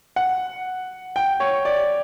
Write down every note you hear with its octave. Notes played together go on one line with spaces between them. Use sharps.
F#5
G5
C#5
D5